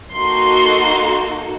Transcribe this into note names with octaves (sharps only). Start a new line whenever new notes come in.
A#3 D#4 F#4 A4 C6